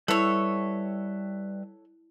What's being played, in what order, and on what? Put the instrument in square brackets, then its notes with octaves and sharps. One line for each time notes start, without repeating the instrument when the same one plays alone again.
[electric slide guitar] G3 B4 E5 [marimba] E4 [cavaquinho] A4 C#5